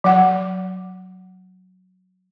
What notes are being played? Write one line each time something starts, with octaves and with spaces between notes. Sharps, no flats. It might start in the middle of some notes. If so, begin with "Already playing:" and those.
F#3 F#5